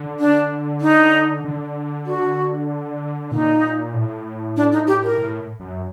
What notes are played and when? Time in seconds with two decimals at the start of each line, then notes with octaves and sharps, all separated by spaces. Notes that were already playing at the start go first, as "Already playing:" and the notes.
Already playing: D3
0.20 D4
0.81 D#4
1.45 D3
2.06 F#4
3.31 A#2 D#4
3.94 A2
4.57 D4
4.72 D#4
4.87 G4
5.03 A#4
5.18 A2
5.60 F#2